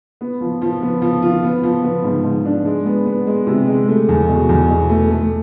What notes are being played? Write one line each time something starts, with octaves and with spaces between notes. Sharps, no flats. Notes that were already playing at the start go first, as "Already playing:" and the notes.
B3
F3
F3
B3
F3
F4
B3
F3
B3
G#2
G#2
D4
G#3
B3
B3
G#3
C3
G#3
A3
E2
B2
E2
B2
A3
A3